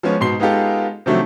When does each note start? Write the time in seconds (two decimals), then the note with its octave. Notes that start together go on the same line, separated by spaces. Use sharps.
0.03 F3 G#3 B3 C#4
0.20 G#2 B2 C6 C7 G7
0.40 G#3 B3 D#4 F4 G4 A4
1.06 C3 D#3 F3 F#3 A3 D4